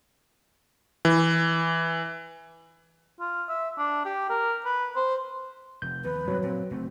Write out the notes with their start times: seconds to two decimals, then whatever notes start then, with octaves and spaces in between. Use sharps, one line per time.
1.05 E3
3.20 F4
3.49 E5
3.78 D4
4.05 G4
4.30 A#4
4.65 B4
4.96 C5
5.82 F1 G6
6.04 D#2 F3 B4
6.28 G2 C3 F3 F#3
6.43 A#2 C4
6.71 F#1 A3 C4